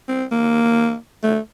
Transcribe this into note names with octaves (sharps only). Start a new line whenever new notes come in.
C4
A#3
A3